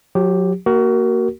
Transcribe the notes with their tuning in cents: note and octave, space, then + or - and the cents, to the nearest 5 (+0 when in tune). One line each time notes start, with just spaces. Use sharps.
F#3 -30 G4 +0
A#3 -20 F#4 +30 A#4 +0